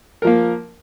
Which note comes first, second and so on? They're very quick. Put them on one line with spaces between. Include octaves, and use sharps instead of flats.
A#4 F3 A#3